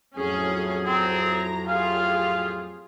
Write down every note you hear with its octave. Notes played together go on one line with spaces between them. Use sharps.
F2 A2 F#3 C#4 G#4
C4 G#4 A#5
F4 G4 G#4 F5